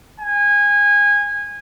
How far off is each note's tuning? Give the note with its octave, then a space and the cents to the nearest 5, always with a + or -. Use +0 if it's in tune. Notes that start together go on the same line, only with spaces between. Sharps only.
G#5 -20